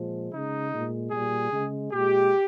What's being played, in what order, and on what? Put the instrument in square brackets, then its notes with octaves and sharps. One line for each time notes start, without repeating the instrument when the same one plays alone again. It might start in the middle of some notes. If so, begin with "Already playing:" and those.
Already playing: [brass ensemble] A#2 F3 G#3
C#3 G#3 D#4
A#2 G#3
A#2 G3 G#4
C#3 G#3
A#2 G#3 G4